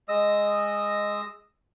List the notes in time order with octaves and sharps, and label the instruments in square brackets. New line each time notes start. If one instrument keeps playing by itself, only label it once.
[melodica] G#3 D#5 D#6 E6